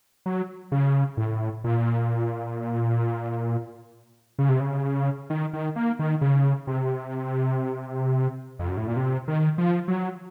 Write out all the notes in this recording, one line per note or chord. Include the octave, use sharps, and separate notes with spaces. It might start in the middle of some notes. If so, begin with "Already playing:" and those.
F#3
C#3
A2
A#2
C#3
C3
C#3
D#3
D#3
A#3
D#3
C#3
C3
F2
F#2
A2
A#2
C3
D#3
F3
F#3